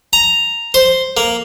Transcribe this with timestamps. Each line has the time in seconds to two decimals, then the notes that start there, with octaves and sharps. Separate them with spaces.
0.13 A#5
0.74 C5
1.17 A#3